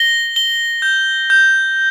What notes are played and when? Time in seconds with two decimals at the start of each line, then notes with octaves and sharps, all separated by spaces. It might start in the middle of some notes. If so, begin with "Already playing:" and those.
Already playing: A#6 G7
0.36 G7
0.82 G6
1.30 G6